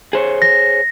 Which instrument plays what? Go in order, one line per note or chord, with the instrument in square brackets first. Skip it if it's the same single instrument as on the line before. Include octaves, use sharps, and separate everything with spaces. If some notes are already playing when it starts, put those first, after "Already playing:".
[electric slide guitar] G#4 C5 C#5
[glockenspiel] A#6